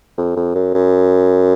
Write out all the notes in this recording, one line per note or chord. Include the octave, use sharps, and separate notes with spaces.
F2
F2
F#2
F#2